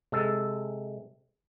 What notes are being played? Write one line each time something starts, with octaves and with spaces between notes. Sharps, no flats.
C3 G#3 A4